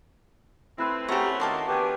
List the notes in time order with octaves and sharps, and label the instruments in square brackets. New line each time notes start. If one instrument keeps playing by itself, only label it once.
[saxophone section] A3 C4 [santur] E4 B4 C5
[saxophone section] A3 C4 [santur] C#4 F#4 C#5 [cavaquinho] G4 A#5
[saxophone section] D#3 A#3 [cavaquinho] A4 A5 C6
[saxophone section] E3 B3 D4 [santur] G4 G5 G#5